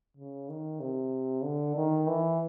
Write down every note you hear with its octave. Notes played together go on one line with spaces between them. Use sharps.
C#3
D#3
C3
D3
D#3
E3